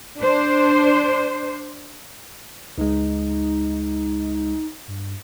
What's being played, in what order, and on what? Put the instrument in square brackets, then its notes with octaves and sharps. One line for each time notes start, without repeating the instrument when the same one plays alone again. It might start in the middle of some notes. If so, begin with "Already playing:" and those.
[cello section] D4 C5
[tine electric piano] C#2 G#3 [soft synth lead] D#4
[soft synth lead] G2